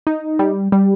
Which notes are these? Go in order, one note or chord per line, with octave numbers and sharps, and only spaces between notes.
D#4
G3
G3